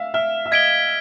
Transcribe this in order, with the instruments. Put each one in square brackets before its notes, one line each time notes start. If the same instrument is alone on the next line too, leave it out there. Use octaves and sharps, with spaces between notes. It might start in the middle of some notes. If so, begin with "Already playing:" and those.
Already playing: [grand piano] E5 F5
[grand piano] E5 [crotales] F6
[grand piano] E5
[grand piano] D#5 [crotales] G#6 B6 D7 G7